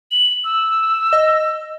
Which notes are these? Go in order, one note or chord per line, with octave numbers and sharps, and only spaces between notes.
F#7
E6
D#5